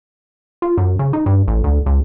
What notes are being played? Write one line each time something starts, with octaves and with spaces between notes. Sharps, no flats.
F4
F#2
C#3
D#4
G2
A1
D2
C#2